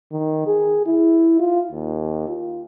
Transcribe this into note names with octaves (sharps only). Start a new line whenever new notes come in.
D#3
G#4
E4
F4
D#2
F4